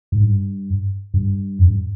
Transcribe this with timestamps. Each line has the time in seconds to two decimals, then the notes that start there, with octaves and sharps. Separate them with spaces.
0.12 G#2
0.23 G2
1.14 G2
1.59 F2
1.67 G2